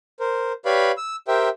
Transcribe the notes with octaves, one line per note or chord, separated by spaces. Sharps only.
A#4 C5
G4 B4 C#5 D5 F5 B5
E6
G4 A#4 C5 E5 G5